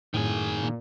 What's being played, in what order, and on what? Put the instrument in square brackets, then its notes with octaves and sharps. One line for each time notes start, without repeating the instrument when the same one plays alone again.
[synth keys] F#2 A2 [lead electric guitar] D#3 G#4
[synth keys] A#2